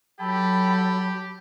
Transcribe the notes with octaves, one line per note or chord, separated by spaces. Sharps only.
F#3 G4 A4 G5 A5 B5